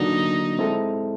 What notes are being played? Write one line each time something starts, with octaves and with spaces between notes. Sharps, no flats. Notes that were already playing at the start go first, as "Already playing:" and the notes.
Already playing: D3 F#3 A#3 D4 D#4 F#4
G#3 C4 E4 A4